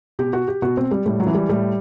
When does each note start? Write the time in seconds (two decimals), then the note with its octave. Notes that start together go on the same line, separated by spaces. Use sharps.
0.19 B2 G4
0.33 F#4
0.48 G4
0.62 B2 F#4
0.77 C4
0.91 G3
1.06 A2 G3
1.20 F#3
1.27 E3
1.35 G3
1.49 A2 G3